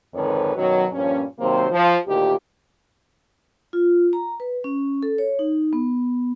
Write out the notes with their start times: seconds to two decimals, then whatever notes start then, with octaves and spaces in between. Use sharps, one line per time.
0.15 F2 G#2 D3 D#3 B4 C#5
0.56 F#2 B2 D#3 F#3
0.92 G2 A#2 F3 C#4
1.39 C3 D#3 F#3 A#3 C5
1.72 F3
2.07 D2 A#2 D#3 G4
3.73 F4
4.13 A#5
4.40 B4
4.64 C#4
5.03 A4
5.18 C#5
5.39 D#4
5.73 B3